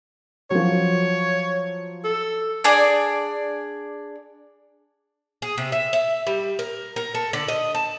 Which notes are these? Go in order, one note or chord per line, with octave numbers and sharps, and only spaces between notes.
F3 F#3 C#5
A4
D4 G#4 D5
G#4
C3
E5
E5
G3
A#4
A#4
A4
D3
D#5
A5